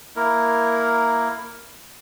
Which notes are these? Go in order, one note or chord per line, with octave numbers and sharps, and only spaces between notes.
A#3 E4 A#4